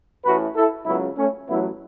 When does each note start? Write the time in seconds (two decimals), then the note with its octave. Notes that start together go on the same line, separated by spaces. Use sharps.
0.24 A1 A2 E3 F#4 B4
0.55 E4 A4
0.86 C#2 C#3 F#3 B3 E4
1.17 A3 C#4
1.47 A1 A2 F#3 B3 E4